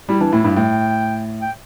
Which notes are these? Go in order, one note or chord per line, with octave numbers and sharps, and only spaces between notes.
G3 E4
E3 D4
A2 E4
G2 E4
A2 G5
G5